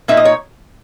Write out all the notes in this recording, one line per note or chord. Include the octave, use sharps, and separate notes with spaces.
A#2 A#3 D#4 E5
D#5
C#5